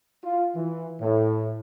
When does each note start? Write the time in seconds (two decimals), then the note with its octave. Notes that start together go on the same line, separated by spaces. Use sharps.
0.24 F4
0.55 E3
1.01 A2